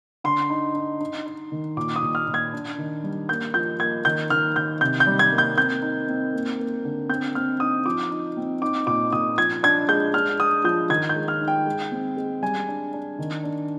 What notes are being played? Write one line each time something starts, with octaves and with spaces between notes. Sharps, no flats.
D3 C6
D#4
D#4
D#4
D#4
D#3
A#2 D6
D#6
A#2
F6
A#2
G#6
D4
D#3
G3
A#3 G6
F3 G6
A#3 G#6
D#3 G6
D#3 F6
D#3 G6
C3 G6
G6
G3
G#6
A#3
G6
C4 G6
D#4
C4
A#3
A#3
D3
C4 G6
C4 F6
D#4 D#6
F3 D6
D#4
C4
D#4 D6
A#2 D6
A#2 D#6
F3 G#6
D4 G#6
G#3 G6
D4 F6
D4 D#6
F3 G6
D#3 G#6
G6
G#3
F6
D#4
G5
G#3
C4
G#3
G3 G#5
D4
D4
D#3
D4